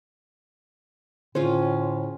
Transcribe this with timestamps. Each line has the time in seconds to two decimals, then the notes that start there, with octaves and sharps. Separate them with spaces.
1.35 A2 D3 C#4 F4 G#4 C5 F5